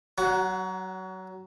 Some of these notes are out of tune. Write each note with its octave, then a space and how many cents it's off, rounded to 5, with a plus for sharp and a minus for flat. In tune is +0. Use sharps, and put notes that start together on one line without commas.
F#3 +25 F#5 -10